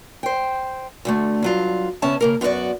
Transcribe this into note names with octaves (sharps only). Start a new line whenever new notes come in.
C5 G5
D2 D3 A3
G2 F#3 F4
C#3 B3 C#4 E5 A5
C#3 A#3 A#4
F#2 B3 E4 F#4 D5